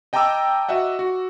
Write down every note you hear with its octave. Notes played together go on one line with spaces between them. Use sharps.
D#5 G5 A5 A#5 D6 E6
F#4 D#5 E5 F#5
F#4